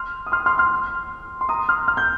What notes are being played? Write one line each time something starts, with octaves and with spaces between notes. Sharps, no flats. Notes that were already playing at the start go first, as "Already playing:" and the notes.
Already playing: C6 F6
D#6
C6 F6
C6 F6
C6 F6
C6
A#5 D#6
C6 F6
F6
G6